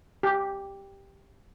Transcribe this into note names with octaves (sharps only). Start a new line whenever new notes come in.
G4